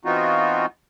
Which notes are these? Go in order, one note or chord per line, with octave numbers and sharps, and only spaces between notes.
E3 B3 C4 D#4 F4 F#4